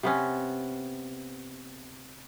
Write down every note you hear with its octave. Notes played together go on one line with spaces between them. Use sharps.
C3 B3 C#4